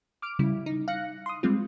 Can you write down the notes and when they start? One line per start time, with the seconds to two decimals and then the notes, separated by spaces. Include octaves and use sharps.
0.22 D6 F6 D7
0.39 C#3 G3 E4
0.66 D#4
0.88 F5 F#6 A#6 C#7
1.26 C6 D#6
1.43 G3 G#3 C4 F4